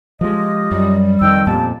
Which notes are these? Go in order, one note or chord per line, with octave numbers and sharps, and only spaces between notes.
F3 G#3 F4 G4 D#5
F#2 G3
F2 D#3 D#5 G5 E6
F2 A#2 B3 G4 A5